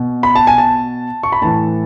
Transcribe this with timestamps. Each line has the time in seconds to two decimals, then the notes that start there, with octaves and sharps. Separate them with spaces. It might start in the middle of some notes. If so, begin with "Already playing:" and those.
Already playing: B2
0.23 B5
0.35 A5
0.47 G#5
0.58 A5
1.23 C#6
1.32 B5
1.42 A2 E3 A5